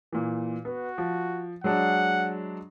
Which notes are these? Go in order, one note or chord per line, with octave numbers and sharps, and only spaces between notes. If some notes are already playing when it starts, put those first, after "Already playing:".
A#2 E3
B3 F#4
F3
F#3 G#3 D4 F#5